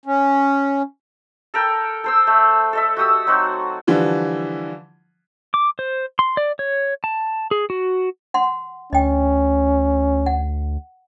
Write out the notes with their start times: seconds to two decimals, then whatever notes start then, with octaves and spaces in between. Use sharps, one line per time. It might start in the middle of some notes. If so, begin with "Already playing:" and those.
0.06 C#4
1.54 A4 A#4 G5
2.04 A4 C5 E6
2.27 A3
2.73 A4 D#5 E5
2.97 F#4 G4 D#6 E6
3.27 F#3 C4 D#4 F#4
3.87 D3 E3 F3 G3
5.54 D6
5.79 C5
6.19 C6
6.37 D5
6.59 C#5
7.04 A5
7.51 G#4
7.70 F#4
8.34 F#5 C6
8.93 D2 C#4 D#5 G5
10.26 F#5